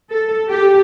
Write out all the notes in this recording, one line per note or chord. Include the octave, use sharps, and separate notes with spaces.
A4
G4